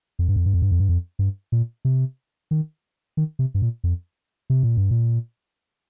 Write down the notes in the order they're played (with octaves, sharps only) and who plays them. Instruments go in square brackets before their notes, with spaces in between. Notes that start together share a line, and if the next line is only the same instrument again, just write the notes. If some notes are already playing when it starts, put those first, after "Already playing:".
[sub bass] F2
G2
F2
G2
F2
G2
F2
G2
F2
G2
A#2
C3
D#3
D#3
C3
G2
A#2
F2
C3
A#2
G2
A#2